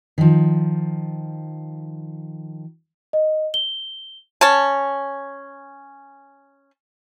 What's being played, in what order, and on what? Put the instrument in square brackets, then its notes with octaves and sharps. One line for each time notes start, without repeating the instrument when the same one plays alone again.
[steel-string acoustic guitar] D#3 F3
[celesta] D#5
G7
[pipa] C#4 A5